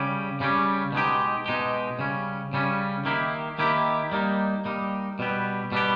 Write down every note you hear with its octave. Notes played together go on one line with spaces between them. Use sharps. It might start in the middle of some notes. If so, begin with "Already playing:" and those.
Already playing: C#3 G3 C#4 G4
C#3 G3 C#4 G4
B2 G#3 D#4 G4
B2 G#3 D#4 G4
C#3 G3 C#4
C#3 G3 C#4
D#3 A#3 E4 G4
D#3 A#3 E4 G4
G3 A#3 D#4
G3 A#3 D#4
B2 G3 B3 G4
B2 G3 B3 G4